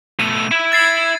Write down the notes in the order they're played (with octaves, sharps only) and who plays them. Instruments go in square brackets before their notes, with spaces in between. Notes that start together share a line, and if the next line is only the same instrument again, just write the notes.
[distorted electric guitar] B2 A3 [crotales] D#7
[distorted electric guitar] E4 E5
[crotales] G#6 A6 C7